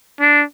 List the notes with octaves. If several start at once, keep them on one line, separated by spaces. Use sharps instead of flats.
D4